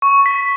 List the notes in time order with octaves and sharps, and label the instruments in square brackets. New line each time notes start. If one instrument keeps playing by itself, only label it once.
[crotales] C#6
B6